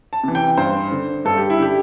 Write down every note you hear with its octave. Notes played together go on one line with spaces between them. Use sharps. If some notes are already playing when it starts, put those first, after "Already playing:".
A5
C3 E3
G5
G2 C5
D3
G2 A4
G4
E4
D3 G4